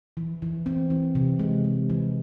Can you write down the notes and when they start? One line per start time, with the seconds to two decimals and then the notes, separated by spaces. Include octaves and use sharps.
0.17 E3
0.42 E3
0.66 C4
0.90 E3
1.15 C3
1.39 G#3
1.64 G#3
1.90 E3